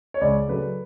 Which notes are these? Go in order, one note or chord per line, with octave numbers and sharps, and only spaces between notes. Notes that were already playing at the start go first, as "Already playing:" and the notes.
C#5
C#2 D5
C#3 F#3 A3 B4